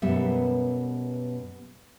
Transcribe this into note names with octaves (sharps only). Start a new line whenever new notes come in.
F#2 B2 G3 B3 E5